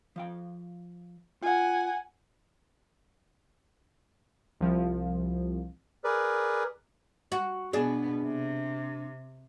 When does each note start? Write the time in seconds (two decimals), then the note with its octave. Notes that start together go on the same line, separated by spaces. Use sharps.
0.16 F3 F5 G5
1.42 F4 F#5 G#5
4.61 C2 F3
6.04 G#4 A#4 B4 D5
7.32 F#4
7.73 B2 B3 D4 G#4
8.23 C3